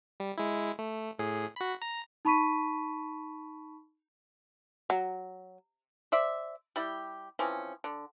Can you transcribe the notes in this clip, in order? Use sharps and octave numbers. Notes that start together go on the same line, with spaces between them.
G3
G#3 E4
A3
A2 G#4
F#4 B5
A#5
D#4 A5 B5 C#6 B6 D#7
F#3
C5 D5 E5
G3 E4 G4
E3 F3 C4 C#4
D3